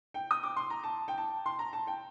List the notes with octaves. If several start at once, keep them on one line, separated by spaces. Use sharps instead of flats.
G5
D#6
D6
C6
A#5
A5
G5
A5
C6
A#5
A5
G5